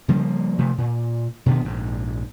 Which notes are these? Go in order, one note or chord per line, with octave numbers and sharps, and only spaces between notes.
C#3 F3 G3 A#3
C3 F3 A3
A#2
B2 D3 D#3 B3
A#1 G#2